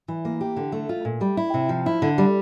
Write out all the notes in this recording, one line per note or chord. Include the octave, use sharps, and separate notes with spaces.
E3
A#3
G4
D3
A3
F4
A#2
G3
E4
C3
F3
E4
D3
G3